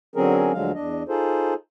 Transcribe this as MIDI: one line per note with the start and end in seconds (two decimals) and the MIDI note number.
0.16 0.52 50
0.16 0.52 54
0.16 0.52 60
0.16 0.52 61
0.16 0.52 68
0.16 0.52 70
0.53 0.72 38
0.53 0.72 50
0.53 0.72 53
0.53 0.72 54
0.53 0.72 56
0.53 0.72 77
0.74 1.03 40
0.74 1.03 62
0.74 1.03 75
1.08 1.54 63
1.08 1.54 65
1.08 1.54 68
1.08 1.54 69
1.08 1.54 72